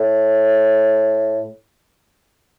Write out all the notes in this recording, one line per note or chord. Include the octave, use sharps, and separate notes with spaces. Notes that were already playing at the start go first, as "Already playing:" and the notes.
Already playing: A2